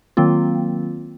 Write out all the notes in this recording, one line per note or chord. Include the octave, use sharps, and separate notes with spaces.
D#3 F#3 A#3 C4 F4